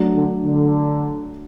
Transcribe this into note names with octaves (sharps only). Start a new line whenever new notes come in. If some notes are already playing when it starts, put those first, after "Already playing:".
Already playing: F#3 A3 D4
D3
D3